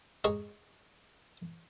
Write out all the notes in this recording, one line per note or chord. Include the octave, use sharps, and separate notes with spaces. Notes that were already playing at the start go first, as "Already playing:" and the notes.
G#3 G#4 C#5 A#5